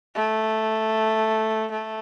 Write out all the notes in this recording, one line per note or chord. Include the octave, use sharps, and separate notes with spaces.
A3
A3